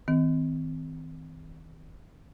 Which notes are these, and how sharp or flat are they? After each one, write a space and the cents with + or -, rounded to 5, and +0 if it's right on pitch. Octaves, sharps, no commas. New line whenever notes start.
D#3 +40 C4 -35